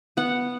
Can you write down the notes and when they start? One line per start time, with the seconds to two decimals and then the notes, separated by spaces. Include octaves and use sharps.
0.17 B3 F#5